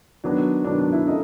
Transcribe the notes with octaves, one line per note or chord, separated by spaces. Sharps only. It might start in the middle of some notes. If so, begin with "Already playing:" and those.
D#3 F#3 B3 D4
D#3 F#3 B3 D4
D4
E4
A3 C#4 F4 A#4 D#5